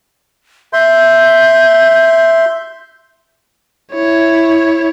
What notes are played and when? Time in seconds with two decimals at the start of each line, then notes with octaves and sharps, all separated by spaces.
0.73 E5 C6 G6
3.93 E4 C#5